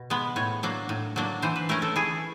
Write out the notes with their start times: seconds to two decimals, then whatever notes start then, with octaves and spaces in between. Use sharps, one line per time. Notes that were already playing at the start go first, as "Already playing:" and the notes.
Already playing: B2
0.10 G#3 B3
0.36 A2 C#5
0.63 F#3 A#3 D4
0.89 A2
1.16 F#3 A#3 D4
1.42 E3 C5
1.56 B4
1.69 A3 C#4 A#4
1.82 A4
1.96 E3 G#4